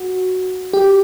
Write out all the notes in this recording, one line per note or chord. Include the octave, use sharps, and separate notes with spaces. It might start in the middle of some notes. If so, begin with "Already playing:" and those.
Already playing: F#4
G4